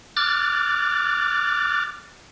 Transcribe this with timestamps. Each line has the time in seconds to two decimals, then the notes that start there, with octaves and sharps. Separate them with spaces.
0.17 D6 F6 F#6 A6